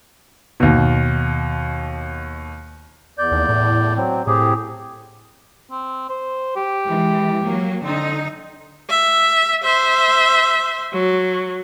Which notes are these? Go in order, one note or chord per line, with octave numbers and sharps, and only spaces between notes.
D#2 B2
E2 D5 G6
D#2
A2
F#3 C4
A2 C4 G4 G#4
C4
C5
G4
E3 G#3
F#3 A#3
D3 C4 D#4
E5
C5 E5
F#3